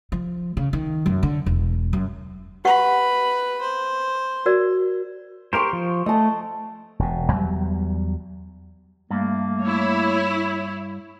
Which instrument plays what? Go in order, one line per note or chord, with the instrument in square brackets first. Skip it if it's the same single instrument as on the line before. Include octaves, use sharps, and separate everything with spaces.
[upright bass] F3
C#3
D#3
F#2
D3
E1
F#2
[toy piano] G4 F#5 C#6 [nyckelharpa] B4 B5
[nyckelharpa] C5
[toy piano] F#4 A#4 D5
[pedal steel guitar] G4 A#4 C5 [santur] C6 C#6
[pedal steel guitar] F3
[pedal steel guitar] A3 [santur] D#5 A5
[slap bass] E1 B2
E2 F#3 G3
[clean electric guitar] G2 [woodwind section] A3 A#3
[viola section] E4 C#5